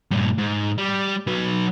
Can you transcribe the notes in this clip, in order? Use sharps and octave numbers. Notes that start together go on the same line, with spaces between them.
G2 A#2
G#2
G3
F#3 B4